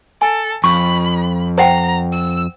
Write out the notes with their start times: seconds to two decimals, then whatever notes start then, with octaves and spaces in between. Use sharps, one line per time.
0.22 A4 G#5
0.64 F2 B5 C#6
1.58 C5 F#5 G5 A#5
2.13 E6